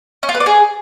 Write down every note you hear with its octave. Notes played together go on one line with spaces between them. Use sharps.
C#4
F4
B4
D5
G#4